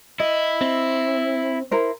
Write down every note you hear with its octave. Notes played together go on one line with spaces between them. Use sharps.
E4 D#5
C4
E4 A#4 C5